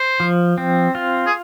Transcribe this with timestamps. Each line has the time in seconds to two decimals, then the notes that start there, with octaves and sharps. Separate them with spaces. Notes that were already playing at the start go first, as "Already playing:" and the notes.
Already playing: C5
0.20 F3
0.58 C4
0.95 F4
1.26 G#4